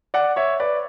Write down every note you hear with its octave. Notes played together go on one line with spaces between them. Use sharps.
D5 F#5
C#5 E5
B4 D5